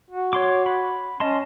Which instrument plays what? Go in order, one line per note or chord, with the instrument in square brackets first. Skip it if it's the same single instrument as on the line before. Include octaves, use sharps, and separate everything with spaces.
[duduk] F#4
[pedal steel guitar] C#5 C6 D6
B5
[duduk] C#4 [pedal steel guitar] D#5 A5 C6